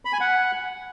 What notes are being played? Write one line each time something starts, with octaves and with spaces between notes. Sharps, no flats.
B5
G#5
F#5